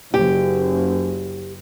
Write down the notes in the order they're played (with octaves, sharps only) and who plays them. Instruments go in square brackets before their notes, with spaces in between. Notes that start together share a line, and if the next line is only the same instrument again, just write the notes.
[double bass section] F#1 [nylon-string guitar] G4